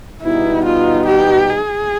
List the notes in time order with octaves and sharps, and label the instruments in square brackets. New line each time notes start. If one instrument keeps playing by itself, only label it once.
[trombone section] B2 G3 B3 D#4 [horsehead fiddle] E4
[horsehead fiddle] F4
G4
G#4